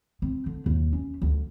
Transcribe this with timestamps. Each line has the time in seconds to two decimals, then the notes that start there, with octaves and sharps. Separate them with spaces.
0.22 C4
0.46 D3
0.66 D#2
0.93 C#4
1.22 D2